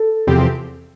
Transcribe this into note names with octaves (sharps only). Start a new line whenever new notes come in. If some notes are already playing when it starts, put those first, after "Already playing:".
Already playing: A4
E2 C3 F3 C4 G4